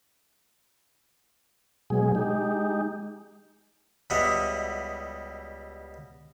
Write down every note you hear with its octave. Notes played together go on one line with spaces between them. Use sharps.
B2 F#3 G#3 G#4
G#3 D#4 G4
C#2 B2 G3 D#5 E5 F#5